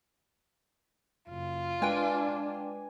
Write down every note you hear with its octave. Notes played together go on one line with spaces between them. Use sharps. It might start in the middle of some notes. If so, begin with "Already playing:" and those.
F#1 F4
G#3 D4 B4 G5 G#5